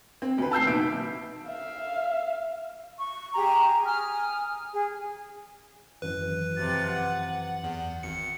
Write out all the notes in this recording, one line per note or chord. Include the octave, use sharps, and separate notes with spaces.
C4
D2 B4
A5 E6 G6 C7
F#1 B2 D#3 E5 D7
E5 F5
C#6
G4 G#4 A#5
G#5 D#6 F6
G#4
G#1 F#2 E3 B4
F2 C3 A6
F#5
E2
G#1 C#7